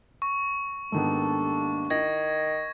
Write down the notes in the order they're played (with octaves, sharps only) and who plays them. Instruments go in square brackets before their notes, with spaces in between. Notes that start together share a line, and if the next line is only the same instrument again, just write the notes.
[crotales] C#6
[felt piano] G#2 D#3 B3 [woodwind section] G3 A#3 D4 [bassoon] A4
[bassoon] D#3 [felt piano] E4 [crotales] G#6 A#6